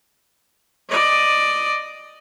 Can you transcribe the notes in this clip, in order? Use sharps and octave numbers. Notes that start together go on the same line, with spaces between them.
D5 D#5